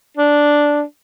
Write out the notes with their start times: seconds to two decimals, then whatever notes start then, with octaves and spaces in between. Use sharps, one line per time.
0.17 D4